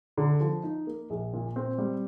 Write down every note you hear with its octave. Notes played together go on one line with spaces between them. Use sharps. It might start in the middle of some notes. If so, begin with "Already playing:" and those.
D3
F3
D#4
A#3
A#1
A#2
C4
G3